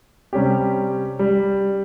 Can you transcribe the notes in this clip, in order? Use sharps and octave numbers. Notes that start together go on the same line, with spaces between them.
C3 G3 C#4 G4
G3